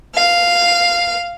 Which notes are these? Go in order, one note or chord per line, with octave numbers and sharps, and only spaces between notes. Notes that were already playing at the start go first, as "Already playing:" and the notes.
F5